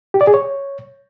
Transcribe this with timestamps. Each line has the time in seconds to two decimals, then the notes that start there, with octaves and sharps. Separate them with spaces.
0.14 G4
0.21 D5
0.27 G#4
0.34 C#5